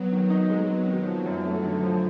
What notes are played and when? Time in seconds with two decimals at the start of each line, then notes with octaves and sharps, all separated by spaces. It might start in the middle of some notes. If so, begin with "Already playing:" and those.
Already playing: F#3 B3
0.12 D#3
0.30 D#4
0.50 G#3
0.70 B3
0.88 D#3
1.07 F3 F#3
1.26 F#2
1.45 A3
1.65 D3
1.83 F3